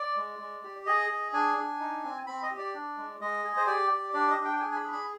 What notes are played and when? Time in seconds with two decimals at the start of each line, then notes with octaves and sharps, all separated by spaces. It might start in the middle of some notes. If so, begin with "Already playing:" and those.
Already playing: D5
0.16 G#3
0.39 G#3
0.63 G4
0.86 G#4 D#5
1.09 G#4
1.33 D4 G#5
1.57 D4
1.80 D#4
2.04 C4
2.27 C4 B5
2.42 D#5
2.51 G4
2.58 D5
2.74 D4
2.97 G#3
3.20 G#3 D#5
3.44 G#4
3.57 C5
3.67 G4 D5
3.91 G4
4.13 D4 D5
4.30 D#5
4.38 D4
4.45 G5
4.57 G5
4.60 G#4 G#5
4.72 G#5
4.76 B5
4.84 G#4
4.92 B5